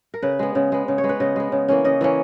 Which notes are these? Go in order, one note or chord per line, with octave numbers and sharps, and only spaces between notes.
A#4
C#3 B4
G#3 B3
C#3
G#3 B3
C#3
C#5
G#3 B3
B4
C#3 D#5
G#3 B3
C#3
E3 A#3 C#4
C#3 D#5
E3 A#3 C#4